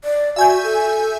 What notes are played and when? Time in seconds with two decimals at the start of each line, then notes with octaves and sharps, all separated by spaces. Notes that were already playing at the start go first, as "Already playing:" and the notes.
0.04 D5
0.36 F#4 E5 G#5 G6
0.63 A4